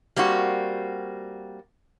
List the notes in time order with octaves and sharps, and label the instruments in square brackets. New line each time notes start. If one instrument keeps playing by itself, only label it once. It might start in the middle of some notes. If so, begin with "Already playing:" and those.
[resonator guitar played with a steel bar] G3 A#3 C4 F#4